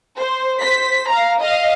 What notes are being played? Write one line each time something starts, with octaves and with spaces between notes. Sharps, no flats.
C5
C5 B6
F5 A#5
D#5 F5